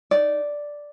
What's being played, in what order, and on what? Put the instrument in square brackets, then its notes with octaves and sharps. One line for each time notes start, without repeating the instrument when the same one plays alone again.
[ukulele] D#4 D5